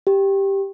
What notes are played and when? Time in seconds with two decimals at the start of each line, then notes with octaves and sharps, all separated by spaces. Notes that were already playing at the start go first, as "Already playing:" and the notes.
0.07 G4